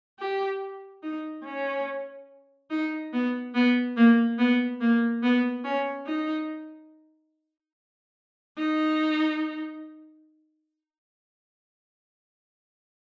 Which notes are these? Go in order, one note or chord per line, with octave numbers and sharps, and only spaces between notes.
G4
D#4
C#4
D#4
B3
B3
A#3
B3
A#3
B3
C#4
D#4
D#4